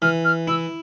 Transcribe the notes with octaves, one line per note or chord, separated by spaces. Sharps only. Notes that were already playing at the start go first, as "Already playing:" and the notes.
E3 F6
F6
E4 E6